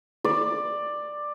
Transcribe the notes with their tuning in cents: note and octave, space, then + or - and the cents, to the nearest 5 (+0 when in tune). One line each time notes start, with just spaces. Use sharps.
D5 +10